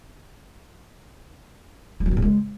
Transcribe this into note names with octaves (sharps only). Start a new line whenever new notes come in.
G3
F#3
D#3
C#3
G#3